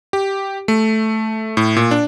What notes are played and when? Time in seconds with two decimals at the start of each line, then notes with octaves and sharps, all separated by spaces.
0.13 G4
0.68 A3
1.57 A2
1.76 A#2
1.91 D4